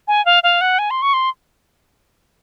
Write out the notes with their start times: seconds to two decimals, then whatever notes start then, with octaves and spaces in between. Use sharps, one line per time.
0.08 G#5
0.25 F5
0.43 F5
0.61 F#5
0.79 G#5
0.90 C6
1.02 C#6
1.13 C6